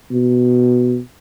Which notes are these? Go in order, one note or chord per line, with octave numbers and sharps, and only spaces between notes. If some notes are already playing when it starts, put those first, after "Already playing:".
B2